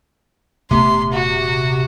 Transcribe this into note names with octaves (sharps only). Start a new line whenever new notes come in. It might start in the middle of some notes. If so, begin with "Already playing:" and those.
D#1 C3 A3 B3 C6
F#4